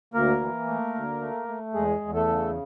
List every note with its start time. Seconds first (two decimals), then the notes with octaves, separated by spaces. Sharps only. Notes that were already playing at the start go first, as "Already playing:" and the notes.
0.14 D2 A#3 A#4
0.41 E3
0.67 A3
0.94 D2
1.21 A3
1.48 A3
1.74 E2 G#3 G#4
2.01 E2
2.14 A3 A4
2.28 C#3